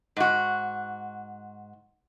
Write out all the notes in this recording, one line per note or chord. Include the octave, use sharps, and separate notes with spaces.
G#2 F#4